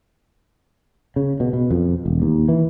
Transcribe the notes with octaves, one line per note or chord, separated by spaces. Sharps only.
C#3
B2
B2
F2
E1
D#2
E3